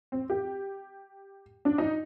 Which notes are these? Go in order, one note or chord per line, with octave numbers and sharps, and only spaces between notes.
C4
G4
D4
D#4